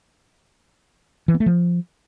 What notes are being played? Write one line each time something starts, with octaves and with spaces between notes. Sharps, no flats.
E3
B3
A3
F3